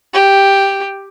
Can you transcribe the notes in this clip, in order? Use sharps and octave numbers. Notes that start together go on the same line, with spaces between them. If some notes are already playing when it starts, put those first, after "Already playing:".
G4